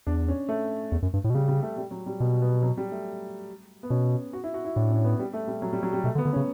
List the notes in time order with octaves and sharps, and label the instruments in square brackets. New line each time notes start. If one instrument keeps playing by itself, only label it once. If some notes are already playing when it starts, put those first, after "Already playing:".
[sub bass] E2 [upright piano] D4
[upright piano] C#4
A3
[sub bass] E2
F#2
G2
A2
B2
[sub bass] C#3 [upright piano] G3
[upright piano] G3
A3
G3
F#3
G3
[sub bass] B2 [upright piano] B3
[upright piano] B3
F#3
G3
A3
B3
[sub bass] B2 [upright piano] C#4
[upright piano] F#4
E4
F#4
E4
[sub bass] A2 [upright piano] D4
[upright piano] C#4
B3
G3
A3
G3
F#3
G3
F#3
G3
[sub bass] B2 [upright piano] A3
[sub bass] D3
[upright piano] B3
[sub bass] D3
[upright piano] C#4
[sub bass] C#3